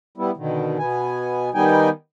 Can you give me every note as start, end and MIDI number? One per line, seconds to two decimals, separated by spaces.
0.18 0.31 55
0.18 0.31 59
0.18 0.31 64
0.37 0.78 47
0.37 0.78 50
0.37 0.78 51
0.79 1.50 47
0.79 1.50 59
0.79 1.50 80
1.54 1.89 51
1.54 1.89 55
1.54 1.89 59
1.54 1.89 63
1.54 1.89 79
1.54 1.89 80